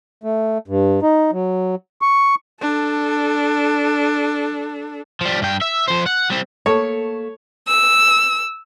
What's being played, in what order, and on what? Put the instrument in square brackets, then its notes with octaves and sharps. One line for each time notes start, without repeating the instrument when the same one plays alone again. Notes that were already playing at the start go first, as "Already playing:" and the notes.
[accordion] A3
G2
D#4
F#3
C#6
[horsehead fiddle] D4 A4
[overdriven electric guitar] F3 G3
G2 G5
E5
F2 C5
F#5
G3 C4
[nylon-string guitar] A3 A#3 [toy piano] A4 A5 [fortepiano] C#5
[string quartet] E6